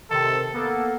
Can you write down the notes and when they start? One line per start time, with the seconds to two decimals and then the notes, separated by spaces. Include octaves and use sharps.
0.11 C3 D#3 A4
0.54 A#3 B3 A4